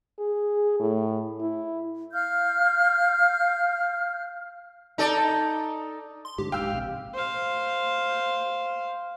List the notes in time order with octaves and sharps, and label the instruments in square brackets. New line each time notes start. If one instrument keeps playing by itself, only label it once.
[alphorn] G#4
A2
E4
[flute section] F5 F6 G6
[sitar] D#4 A4 D5
[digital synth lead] C6
[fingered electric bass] G#2 D3 [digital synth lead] G4
[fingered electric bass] D#1 G#2 [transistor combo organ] F5 [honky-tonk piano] G5 E6
[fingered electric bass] A#1 C3
[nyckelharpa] C5 F5